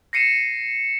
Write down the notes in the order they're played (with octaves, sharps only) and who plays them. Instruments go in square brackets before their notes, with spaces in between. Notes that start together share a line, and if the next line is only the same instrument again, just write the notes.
[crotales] A#6 C7 C#7 D#7 E7